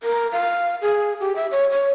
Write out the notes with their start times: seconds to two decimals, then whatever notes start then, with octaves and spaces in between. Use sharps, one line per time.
0.03 A#4
0.32 F5
0.82 G#4
1.20 G4
1.36 E5
1.51 C#5
1.70 C#5